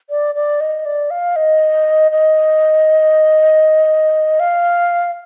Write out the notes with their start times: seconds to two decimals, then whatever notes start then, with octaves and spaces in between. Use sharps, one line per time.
0.10 D5
0.35 D5
0.60 D#5
0.85 D5
1.10 F5
1.36 D#5
2.11 D#5
4.40 F5